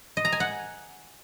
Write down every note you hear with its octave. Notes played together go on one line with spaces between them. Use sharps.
D#5
A#5
G#5
F#5